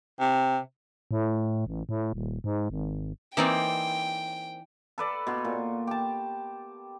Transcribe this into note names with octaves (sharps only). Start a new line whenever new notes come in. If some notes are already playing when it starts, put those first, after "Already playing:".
C3
A2
A1
A2
D#1
G#2
G#1
E3 A#3 C4 D#4 D5 G5
A4 B4 D5
B2 C6 C#6
A#2
G4 A5